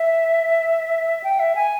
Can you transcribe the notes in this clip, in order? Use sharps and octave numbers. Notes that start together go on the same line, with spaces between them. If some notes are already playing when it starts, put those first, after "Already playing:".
Already playing: E5
G5
E5
G#5